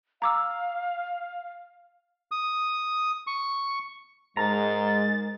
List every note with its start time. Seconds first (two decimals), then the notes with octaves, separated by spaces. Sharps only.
0.22 F5 A#5 D6 E6
2.31 D#6
3.27 C#6
4.37 G#2 G#3 A#4 A#5 A6